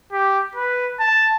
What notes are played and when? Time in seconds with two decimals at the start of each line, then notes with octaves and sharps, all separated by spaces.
0.12 G4
0.55 B4
1.00 A5